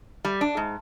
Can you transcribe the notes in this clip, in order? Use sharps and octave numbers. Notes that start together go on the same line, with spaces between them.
G3
D4
G#2